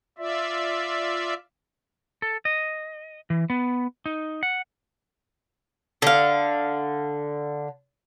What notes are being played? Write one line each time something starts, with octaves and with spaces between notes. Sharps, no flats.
F4 D5 E5
A4
D#5
E3
B3
D#4
F#5
D3 F5